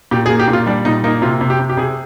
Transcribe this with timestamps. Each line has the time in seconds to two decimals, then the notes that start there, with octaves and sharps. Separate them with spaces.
0.11 A#2 G4
0.26 G#4
0.30 A#3
0.39 G4
0.48 A#2
0.53 F4
0.66 G3 D4
0.85 A#2 D#4
1.04 A#3 D#4
1.22 C3 F4
1.41 C3
1.50 G4
1.59 C3
1.70 G4
1.77 C3 G#4